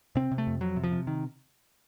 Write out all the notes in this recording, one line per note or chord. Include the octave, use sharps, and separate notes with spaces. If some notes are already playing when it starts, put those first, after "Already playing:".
C3 C4
C3
A3
F2
F2 F#3
C3
F3
C3
D#3